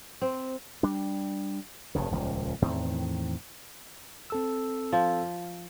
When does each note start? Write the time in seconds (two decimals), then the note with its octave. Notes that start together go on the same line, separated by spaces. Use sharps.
0.22 C4
0.83 G3 D4
1.95 F1 G2 C#3
2.12 D#1 C#2 F3
2.62 E2 A2 D#3 C4
4.30 C4 A4 E6
4.93 F3